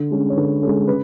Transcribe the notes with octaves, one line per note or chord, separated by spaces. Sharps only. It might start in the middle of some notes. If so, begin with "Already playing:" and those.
Already playing: D3
G#3 C#4
C#5
D3 B4
G#3 C#4 A4
C#3 B4